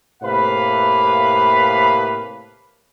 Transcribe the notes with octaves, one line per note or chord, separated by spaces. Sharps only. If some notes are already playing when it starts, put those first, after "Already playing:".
A2 C3 A#3 B4 F5 B5